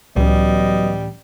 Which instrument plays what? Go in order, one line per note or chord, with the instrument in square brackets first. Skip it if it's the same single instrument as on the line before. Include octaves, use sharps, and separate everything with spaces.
[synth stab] C#2 [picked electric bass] A2 E3 C#4 [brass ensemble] F#3 B3 D#5 [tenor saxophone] G3